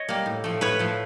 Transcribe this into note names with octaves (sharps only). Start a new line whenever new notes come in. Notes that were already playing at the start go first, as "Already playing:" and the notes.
Already playing: C#5 D#5
G3 A#3
A2
F3 A3
A2 B4 C#5
F3 A3